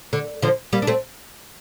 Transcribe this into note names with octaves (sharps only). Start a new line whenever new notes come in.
D3
D3 F3
G3 A#3
D4
A3 C4